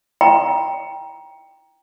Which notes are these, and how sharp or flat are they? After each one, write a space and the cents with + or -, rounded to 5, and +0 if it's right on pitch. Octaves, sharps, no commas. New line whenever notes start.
G5 +5 A#5 +20